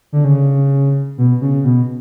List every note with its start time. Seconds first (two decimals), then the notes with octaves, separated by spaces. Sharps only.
0.13 D3
0.24 C#3
1.18 B2
1.42 C#3
1.64 B2